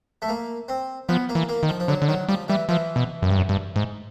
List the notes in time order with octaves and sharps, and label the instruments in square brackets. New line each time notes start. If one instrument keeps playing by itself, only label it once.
[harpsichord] A3
A#3
C4
[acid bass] F3 [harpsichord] B3
[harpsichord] A#3
[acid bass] E3
[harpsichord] A#3
[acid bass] D#3
[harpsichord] F3
F3
[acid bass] D3 [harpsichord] F#3
[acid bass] D3
[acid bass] D#3 [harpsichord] F#3
[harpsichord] F3 [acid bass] G3
[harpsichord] E3 [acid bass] G3
[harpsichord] E3 [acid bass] F3
[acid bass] B2
F#2
G2
F#2
G2
G#2